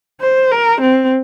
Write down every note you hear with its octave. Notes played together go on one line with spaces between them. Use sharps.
C5
A#4
C4